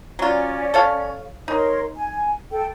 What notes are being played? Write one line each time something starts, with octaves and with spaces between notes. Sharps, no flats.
F#3 C#4 F4 D5
A4 C#5 F5
D#4 A#4 C#5 C6
G#5
A4 G5